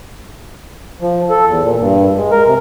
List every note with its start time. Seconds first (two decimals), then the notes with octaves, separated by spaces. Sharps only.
1.01 F3
1.30 A4
1.47 E2
1.62 A#2
1.79 G2
2.17 G#3
2.31 A#4
2.46 C3